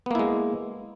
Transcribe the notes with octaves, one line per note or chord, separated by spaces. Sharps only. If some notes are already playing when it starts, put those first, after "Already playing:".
G#3 A#3 B3 E4